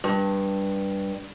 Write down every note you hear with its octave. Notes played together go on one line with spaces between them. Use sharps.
G2